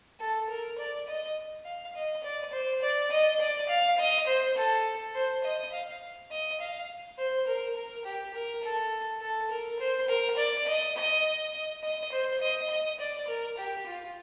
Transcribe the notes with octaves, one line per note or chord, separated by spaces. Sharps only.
A4
A#4
D5
D#5
F5
D#5
D5
C5
D5
D#5
D5
F5
D#5
C5
A4
C5
D#5
F5
D#5
F5
C5
A#4
A#4
G4
A#4
A4
A4
A#4
C5
A#4
D5
D#5
D#5
D#5
C5
D#5
D#5
D5
A#4
G4
F4